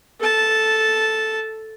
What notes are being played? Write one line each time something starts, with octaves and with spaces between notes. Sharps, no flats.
A4 A5